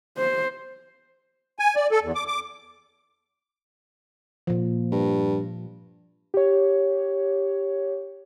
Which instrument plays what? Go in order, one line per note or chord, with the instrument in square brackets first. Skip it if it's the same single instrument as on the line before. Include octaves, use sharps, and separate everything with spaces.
[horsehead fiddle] C5
[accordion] G#5
D5
A4
E2
D6
D6
[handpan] A#2 F3
[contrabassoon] G2
[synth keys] G4 C#5